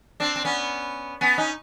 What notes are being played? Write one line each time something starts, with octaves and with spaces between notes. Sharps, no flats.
C4 D4
C4
B3 C#4
B3 C#4
C#4 D#4